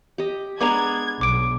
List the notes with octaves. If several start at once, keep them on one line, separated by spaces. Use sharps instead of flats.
G4 D#5
G#3 B3 D4 A#5 D6 G#6
B1 D6 D7